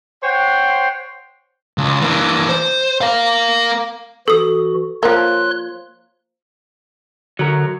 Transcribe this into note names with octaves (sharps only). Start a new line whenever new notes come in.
C5 C#5 F#5 G5 C6
C#2
E3 A#3
C5
A#4 F5
E3 F#4 A4 D#6
F3 A#3 C#5 C6 F#6
D3 F#3 A#4